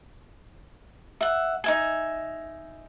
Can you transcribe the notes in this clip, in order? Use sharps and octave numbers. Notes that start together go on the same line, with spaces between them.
E5 F#5
D#4 E5 G#5